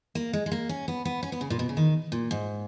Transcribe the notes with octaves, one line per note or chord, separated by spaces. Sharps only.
A#3
G#3
G#3
A#3
C#4
B3
B3
C#4
B3
C#3
A#2
B2
C#3
D#3
A#2
G#2